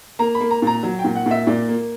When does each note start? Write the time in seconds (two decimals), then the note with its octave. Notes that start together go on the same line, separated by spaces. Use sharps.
0.19 A#3 A#5
0.35 B5
0.41 A#3
0.51 A#5
0.62 A#2 A#5
0.83 F#3
0.99 G5
1.04 A#2
1.15 F#5
1.26 A#2
1.31 E5
1.47 A#2 D5
1.69 A#3